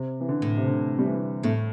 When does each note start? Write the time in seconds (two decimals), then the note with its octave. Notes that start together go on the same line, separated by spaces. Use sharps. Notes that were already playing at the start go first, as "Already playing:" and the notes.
Already playing: C3
0.20 E3
0.29 D3
0.42 A2
0.57 C3
0.67 D3
0.98 G3
1.06 E3
1.43 A2 A3